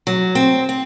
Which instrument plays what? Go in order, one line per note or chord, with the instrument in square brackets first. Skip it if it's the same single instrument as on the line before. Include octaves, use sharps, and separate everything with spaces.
[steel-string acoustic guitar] F#3
C4
C4